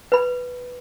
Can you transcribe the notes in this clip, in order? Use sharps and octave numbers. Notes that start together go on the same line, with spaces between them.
B4 B5